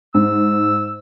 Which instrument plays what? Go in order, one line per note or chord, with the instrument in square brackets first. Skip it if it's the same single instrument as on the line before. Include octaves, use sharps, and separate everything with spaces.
[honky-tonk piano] G#2 [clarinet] E6